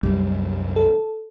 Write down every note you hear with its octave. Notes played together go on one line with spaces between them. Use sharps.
C2 F#2 G3
A4